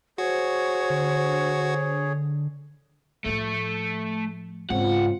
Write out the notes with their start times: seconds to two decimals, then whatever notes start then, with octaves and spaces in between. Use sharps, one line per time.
0.18 F#4 G#4 C5 C#5
0.90 D3
3.26 A2 F3 A3
4.70 G#2 C#3 C4 F4 F#5